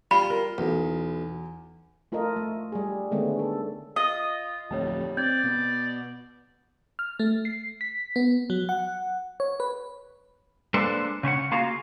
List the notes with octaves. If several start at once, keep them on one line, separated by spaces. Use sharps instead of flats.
G3 F4 B5
A#4
B1 E2
A3 F4 A4 A#4 D#5
A3
G3 G#4
D3 D#3 G#3 A3 B3 C#4
A4
F4 D#5
D1 F2 G3 A3 C#5 A5
C4 D5 G6 G#6
B2 B3
F6
A3
C7
B6
B3
F#3
F#5
C#5
B4
G#3 A#3 D4 A4 B4 C5
C#3 C#4 C5 F#5
A#3 F4 F#4 G#4 F5